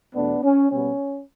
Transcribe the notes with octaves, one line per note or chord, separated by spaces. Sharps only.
E2 B2 A3 B3 D4
C#4
B2 G3 B3 C#4